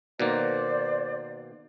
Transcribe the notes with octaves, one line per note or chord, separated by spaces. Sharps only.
B2 D#3 A#3 C5 D5